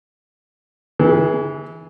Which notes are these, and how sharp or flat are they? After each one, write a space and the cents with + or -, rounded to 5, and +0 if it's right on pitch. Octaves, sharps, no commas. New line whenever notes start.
E3 -25 G#4 +10